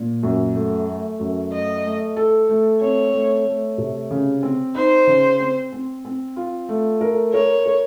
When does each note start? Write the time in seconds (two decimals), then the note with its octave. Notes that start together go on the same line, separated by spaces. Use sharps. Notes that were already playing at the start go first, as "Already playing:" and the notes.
Already playing: A#2
0.23 F#2
0.55 A3
0.87 A3
1.20 F#2
1.52 A3 D#5
1.84 A3
2.16 A4
2.49 A3
2.81 C4 C#5
3.14 A3
3.46 A3
3.78 C3
4.11 C#3
4.43 C4
4.75 D#4 C5
5.07 C#3
5.40 C4
5.72 C4
6.05 C4
6.36 F4
6.69 A3
7.01 A#4
7.34 A#4 C#5
7.66 A#4